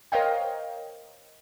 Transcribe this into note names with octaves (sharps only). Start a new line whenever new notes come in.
A#4 C5 C#5 D#5 F5 G5